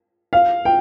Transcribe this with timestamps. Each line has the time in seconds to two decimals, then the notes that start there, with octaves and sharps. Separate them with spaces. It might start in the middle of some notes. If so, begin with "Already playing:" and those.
0.33 F5
0.65 G5